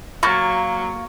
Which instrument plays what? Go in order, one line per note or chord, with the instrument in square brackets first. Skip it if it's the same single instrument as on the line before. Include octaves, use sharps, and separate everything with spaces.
[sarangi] F#3 [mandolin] A#3 [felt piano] C#6 G#6 A6